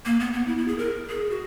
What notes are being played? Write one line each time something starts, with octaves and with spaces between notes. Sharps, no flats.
A#3
B3
B3
E4
E4
G#4
A#4
G#4
F#4